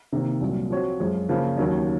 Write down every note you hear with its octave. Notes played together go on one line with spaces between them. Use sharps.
C3 D#3 A#3
C2 A#2 F#3
F3 C4 F#4 C#5
F#2 F3 G#3
C#3 F3 A#3 C#4
D#2 D#3 F#3 C#4